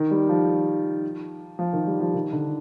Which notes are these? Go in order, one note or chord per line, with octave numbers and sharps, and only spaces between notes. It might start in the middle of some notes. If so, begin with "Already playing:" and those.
Already playing: D#3
G3
F3
F3
D#3
G3
F3
D#3
D3